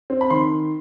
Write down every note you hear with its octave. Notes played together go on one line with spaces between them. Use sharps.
C4
B5
D#3 C6